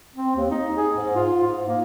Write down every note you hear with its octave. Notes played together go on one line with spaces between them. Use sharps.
C4
D#2
D#4
G#4
G#2
F4
G#2
A#3